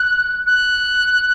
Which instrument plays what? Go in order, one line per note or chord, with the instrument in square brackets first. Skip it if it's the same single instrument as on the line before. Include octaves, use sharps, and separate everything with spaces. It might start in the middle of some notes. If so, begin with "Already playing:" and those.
Already playing: [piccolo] F#6
F#6